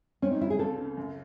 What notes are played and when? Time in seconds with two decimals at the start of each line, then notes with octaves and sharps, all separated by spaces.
0.22 C4 C#4
0.31 D#4
0.41 C#3 E4
0.50 G#4
0.59 C#2 A4
0.78 C#3
0.97 F#2